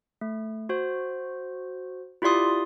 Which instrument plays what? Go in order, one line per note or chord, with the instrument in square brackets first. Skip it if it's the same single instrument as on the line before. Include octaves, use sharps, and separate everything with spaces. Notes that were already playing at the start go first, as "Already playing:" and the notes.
[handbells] A3
F#4 C5
E4 F4 G4 D5 C6 D#6